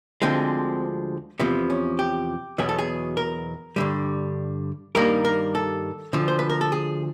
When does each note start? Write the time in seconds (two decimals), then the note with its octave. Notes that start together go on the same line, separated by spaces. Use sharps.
0.22 D2 D3 F3 G#3 C4
1.39 E2 C3 F3 B3
1.70 C#4
1.99 G4
2.58 E2 B2 F#3 B3 G#4
2.69 A4
2.79 G#4
3.17 A#4
3.76 G2 D3 G3
4.95 G2 D#3 G3 A#3 A#4
5.25 A#4
5.55 A4
6.13 D2 D3 F3
6.28 C5
6.39 B4
6.50 A#4
6.61 A4
6.72 G#4